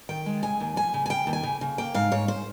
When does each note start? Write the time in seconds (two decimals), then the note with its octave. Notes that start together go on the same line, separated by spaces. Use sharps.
0.09 D#3 G5
0.26 G#3
0.43 C#3 G#5
0.60 D#2
0.76 F3 G#5
0.94 C#3
1.06 G#5
1.10 C#3 G5
1.27 D#2
1.33 G#5
1.43 C#3
1.61 C#3
1.78 A#3 G5
1.94 G#2 F5
2.12 G#2 C#5
2.28 C5